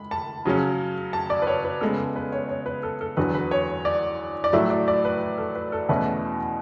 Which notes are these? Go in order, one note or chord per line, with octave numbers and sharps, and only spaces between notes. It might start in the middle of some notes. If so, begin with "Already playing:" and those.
Already playing: G#3 B5
A5
C#3 F#3 C#4
A5
D5
B4
C#5
B4
C#3 G#3 B3 A4
A4
B4
C#5
C#5
B4
A4
A4
E2 D3 F#3 B4
B4
C#5
D5
D5
A2 F#3 A3 E5
D5
D5
B4
B4
A4
B4
A4
E2 B2 A3 C#4 E4 B4